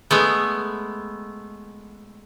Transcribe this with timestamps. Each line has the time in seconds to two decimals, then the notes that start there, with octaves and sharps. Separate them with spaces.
0.11 G#3 A3 B3